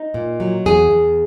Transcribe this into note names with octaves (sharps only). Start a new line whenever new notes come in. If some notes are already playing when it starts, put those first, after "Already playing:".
Already playing: D#4
A#2
F#3
E2 G#4
E2